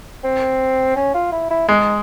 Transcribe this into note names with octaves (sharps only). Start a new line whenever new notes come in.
C4
C#4
F4
E4
E4
G#3 D#4